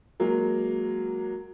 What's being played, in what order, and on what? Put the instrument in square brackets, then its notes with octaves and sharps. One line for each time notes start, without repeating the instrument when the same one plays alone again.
[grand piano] F#3 G#3 A#3